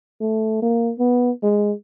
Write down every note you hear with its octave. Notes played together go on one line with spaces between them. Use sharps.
A3
A#3
B3
G#3